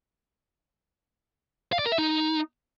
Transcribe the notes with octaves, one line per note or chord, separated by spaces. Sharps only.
F5
D5
A#4
E5
D#4